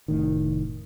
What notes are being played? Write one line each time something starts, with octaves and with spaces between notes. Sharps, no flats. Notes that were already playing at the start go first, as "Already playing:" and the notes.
F1 A2 D#3